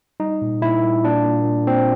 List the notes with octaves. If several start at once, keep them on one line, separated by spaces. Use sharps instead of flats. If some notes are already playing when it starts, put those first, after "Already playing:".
G3 D#4
A#2
A#2 E4
G3
A#2 D4
A#2
A#2
A#2 C4